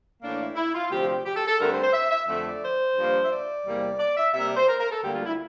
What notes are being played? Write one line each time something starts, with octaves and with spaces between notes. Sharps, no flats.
A2 E3 A#3 D4
E4
E4
F4
D2 C3 F3 C4 G4
G4
G4
A4
A4
G2 D3 A3 C4 A#4
C5
C5
E5
E5
F2 D3 A3 E5
D5
C5
G2 F3 A#3
E5
D5
E2 C3 G3 A#3
D5
E5
C3 G3 A#3 E5
D5
C5
A#4
A#4
A4
D2 D3 G3 A#3 G4
F4
E4